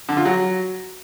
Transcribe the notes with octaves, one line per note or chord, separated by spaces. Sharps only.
D3
F4
F#3